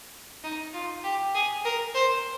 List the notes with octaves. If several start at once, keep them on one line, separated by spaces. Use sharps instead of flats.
D#4
F4
G4
G#4
A#4
C5